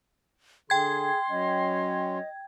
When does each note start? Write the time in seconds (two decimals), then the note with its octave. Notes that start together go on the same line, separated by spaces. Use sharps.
0.70 D3 G#4 G5 C6 G#6
1.30 F#3 C#4 D#5